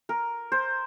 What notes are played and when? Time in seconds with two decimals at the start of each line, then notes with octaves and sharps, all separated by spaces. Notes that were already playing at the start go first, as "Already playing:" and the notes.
0.09 A#4
0.52 C5